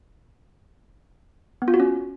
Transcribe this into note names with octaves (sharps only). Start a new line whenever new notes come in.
B3
F4
F#4
C#4